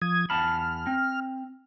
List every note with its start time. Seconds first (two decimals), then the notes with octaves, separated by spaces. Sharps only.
0.02 F3 D#6 G#6
0.30 E2 A5 B5 F6
0.87 C4